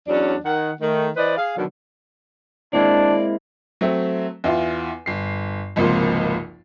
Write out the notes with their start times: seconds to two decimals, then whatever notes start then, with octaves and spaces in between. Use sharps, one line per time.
0.08 E2 F#3 C#4 D4
0.44 D#3 F#5
0.81 D#3 A3
1.17 E3 B4 C5 D5 D#5
1.37 G#4 F5
1.57 B2 D3 D#3 F#3
2.73 G#3 A#3 C4 D4 E4 D5
3.81 F#3 A3 C4 E5
4.44 E2 E4 F4
5.06 G1 C7
5.76 G#1 C#2 C3 F3 A#3 C6